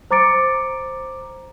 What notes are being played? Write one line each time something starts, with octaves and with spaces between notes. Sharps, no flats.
C5 A#5 D6 A6 C#7 D7